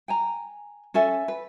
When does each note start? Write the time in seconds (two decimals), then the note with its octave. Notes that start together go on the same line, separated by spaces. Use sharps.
0.08 G5 G#5 A#5
0.94 C#4 A4 E5 G#5
1.28 B4